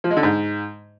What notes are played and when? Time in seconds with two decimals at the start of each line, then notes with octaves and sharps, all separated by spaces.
0.04 F3
0.10 G#3
0.17 D3
0.23 G#2